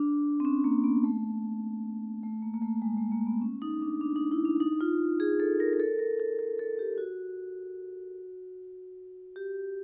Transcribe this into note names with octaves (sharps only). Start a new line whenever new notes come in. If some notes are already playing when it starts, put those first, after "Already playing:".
Already playing: D4
C4
C#4
A#3
B3
A3
A3
A#3
A#3
A3
G#3
A3
A#3
B3
C#4
D#4
D4
D4
D#4
E4
D4
D#4
F4
G#4
A4
A#4
A#4
A4
A#4
A4
A4
A4
G4
F#4
G4